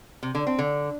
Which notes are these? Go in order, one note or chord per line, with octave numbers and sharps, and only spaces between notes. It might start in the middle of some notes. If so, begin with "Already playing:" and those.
C3
D3
C4
D3